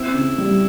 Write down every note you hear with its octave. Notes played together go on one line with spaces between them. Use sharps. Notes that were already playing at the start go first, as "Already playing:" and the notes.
Already playing: C4 E4
C#3
G3